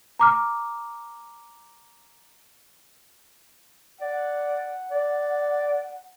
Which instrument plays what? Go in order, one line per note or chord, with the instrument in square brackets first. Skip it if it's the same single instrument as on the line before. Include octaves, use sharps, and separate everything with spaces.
[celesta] A#5 D6 F6
[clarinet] D5 [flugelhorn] F#5
[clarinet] D5